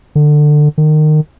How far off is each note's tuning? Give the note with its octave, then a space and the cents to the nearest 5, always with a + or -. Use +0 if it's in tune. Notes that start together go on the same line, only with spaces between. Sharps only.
D3 +20
D#3 -25